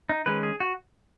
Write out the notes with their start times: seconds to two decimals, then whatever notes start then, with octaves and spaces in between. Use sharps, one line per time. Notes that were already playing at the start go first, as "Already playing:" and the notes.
0.09 D#4
0.26 D#3 G#3 C#4 B4
0.43 G#4
0.60 F#4